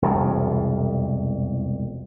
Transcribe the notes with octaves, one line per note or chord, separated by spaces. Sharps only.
E1 C2 F2